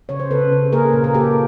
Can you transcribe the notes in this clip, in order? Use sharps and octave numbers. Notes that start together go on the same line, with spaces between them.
C#3 C#5
C5
C#3 A4 B4
C#3
A#3 G#4 A#4
A#2
A#4
A#3 G4 A4